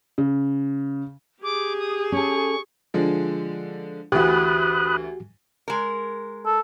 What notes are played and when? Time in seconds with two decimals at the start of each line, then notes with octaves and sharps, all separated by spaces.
0.18 C#3
1.43 G4 G#4 D6
1.79 D#6
2.12 C#4 A4 C#6
2.94 D3 F3 G#3
4.12 D2 E3 F#4 G4 B5 D#6 F#6
5.68 G#3 A#4
6.46 A4